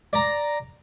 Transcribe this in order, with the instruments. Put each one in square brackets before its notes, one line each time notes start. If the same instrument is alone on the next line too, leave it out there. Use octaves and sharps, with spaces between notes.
[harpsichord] D5 A#5